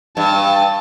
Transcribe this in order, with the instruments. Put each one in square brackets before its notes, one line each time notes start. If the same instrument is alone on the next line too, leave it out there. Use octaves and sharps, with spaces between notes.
[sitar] G2 [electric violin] A5